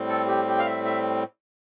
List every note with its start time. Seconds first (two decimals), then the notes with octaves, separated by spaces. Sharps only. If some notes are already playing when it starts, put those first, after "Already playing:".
Already playing: A2 G3 C4
0.09 A4
0.28 G4
0.47 G4
0.59 F5
0.66 E5
0.85 E5